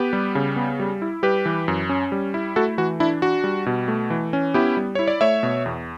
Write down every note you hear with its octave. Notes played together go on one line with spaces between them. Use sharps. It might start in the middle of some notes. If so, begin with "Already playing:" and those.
Already playing: B3 G4 B4
G3
C#3
B3
G3
E4
G3 G4 B4
E3
F#2
C#4
G3
E4
A3 F#4 A4
E3 F#4
D4 E4
D4 F#4
G3
B2
A3
E3
C#4
B3 E4 G4
G3
E4 C#5
D5
A3 C#5 E5
B2
E2